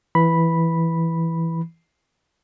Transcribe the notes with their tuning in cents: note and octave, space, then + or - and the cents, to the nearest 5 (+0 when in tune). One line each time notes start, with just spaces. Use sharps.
E3 +0 B5 -5